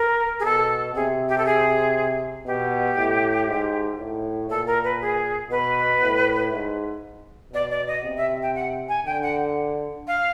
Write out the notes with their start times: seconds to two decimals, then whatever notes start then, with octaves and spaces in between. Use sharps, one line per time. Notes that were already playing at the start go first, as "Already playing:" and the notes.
Already playing: A#4
0.39 G#4
0.44 B2 A4
0.94 C3 G#4
1.28 G4
1.38 A4
1.45 G#4
2.46 B2 G4
2.97 A2
3.47 G#2
3.99 A2
4.49 A#2 A4
4.66 A#4
4.84 B4
5.00 G#4
5.50 B2 B4
6.02 A2
6.52 G#2
7.53 B2 D5
7.70 D5
7.87 D#5
8.04 C3
8.17 E5
8.42 G5
8.54 F#5
8.88 G#5
9.05 D3 G5
9.22 F#5
10.07 F5